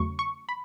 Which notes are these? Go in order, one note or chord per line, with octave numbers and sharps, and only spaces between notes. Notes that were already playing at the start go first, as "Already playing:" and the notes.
Already playing: E2 C#3 F#3 A3 C#6
C#6
B5